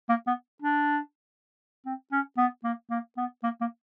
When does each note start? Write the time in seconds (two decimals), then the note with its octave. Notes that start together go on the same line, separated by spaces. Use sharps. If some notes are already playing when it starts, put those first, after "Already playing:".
0.09 A#3
0.27 B3
0.62 D4
1.85 C4
2.12 C#4
2.37 B3
2.64 A#3
2.90 A#3
3.17 B3
3.43 A#3
3.61 A#3